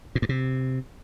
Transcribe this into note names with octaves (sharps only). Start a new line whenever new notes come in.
A#2
G2
C3